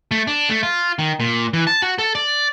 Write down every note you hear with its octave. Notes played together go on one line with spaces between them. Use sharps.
A3
D4
A3
F4
D#3
A#2
E3
A5
F#4
A4
D5